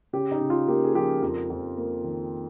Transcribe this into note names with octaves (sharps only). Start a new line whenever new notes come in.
C#3 G4
D#4
C#3
F4
A#3 G4
G#4
F3 G4
F2 A#4
F2
A#3
D#3